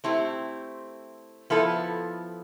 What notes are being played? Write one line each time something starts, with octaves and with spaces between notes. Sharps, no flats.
A3 C4 E4 G4
F3 B3 E4 A4